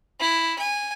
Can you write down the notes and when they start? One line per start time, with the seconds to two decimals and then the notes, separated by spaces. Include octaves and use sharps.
0.20 E4
0.58 G#5